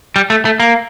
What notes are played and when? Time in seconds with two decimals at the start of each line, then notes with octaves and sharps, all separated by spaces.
0.16 G3
0.30 A3
0.45 A3
0.60 A#3